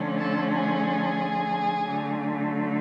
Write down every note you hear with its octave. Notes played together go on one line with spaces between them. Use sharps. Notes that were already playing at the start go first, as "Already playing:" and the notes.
Already playing: D3 F3 A3 C#4
A4
G#4
D3 F#3 A3